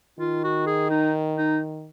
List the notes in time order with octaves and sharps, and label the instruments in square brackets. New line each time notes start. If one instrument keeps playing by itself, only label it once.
[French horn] D#3 [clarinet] F4
[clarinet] F#4
G#4
D#4
D#4